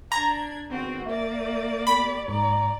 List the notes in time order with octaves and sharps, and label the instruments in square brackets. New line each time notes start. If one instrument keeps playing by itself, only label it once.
[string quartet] D4 G#6 [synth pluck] A#5
[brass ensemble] G#1 B3 [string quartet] C4 F#4
[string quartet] A#3 D5 [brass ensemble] E5
[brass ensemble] B3 G4 [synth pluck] B5
[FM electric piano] G#2 [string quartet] D5 [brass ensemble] A#5